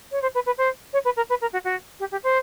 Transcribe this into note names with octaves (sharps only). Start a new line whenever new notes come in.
C#5
C5
B4
B4
C5
C#5
B4
A#4
B4
A#4
F#4
F#4
G4
G4
C5